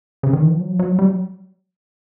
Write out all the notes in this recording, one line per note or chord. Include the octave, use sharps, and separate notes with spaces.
C#3
D#3
E3
F3
F#3
F3
F#3
G3
F#3